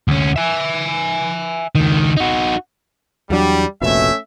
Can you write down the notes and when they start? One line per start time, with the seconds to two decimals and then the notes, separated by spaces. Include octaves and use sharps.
0.08 D2 C#4
0.36 E5 G#5
1.75 C#2 D#3
2.17 D#4 F#4
3.30 E2 F#3 G3 D4
3.81 F1 A#1 B2 A3 C#4 E5